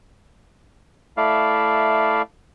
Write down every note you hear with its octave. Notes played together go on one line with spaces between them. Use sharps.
A3 E4 D5 F5